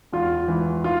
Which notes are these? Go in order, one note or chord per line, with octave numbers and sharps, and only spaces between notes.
E2 F4
E3
F4